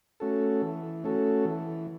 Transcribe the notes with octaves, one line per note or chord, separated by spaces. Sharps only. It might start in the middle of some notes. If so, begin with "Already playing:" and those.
A3 C#4 F#4 A4
E3
A3 C#4 F#4 A4
E3